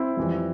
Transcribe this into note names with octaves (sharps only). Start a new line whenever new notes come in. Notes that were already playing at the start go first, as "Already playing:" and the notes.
Already playing: C4 E4
F2 E3 G3